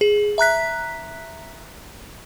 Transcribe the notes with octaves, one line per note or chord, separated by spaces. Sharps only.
G#4
E5 A#5 F#6 B6